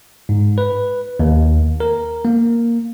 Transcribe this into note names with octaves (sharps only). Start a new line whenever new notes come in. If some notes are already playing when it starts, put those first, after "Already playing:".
G#2
B4
D#2
A#4
A#3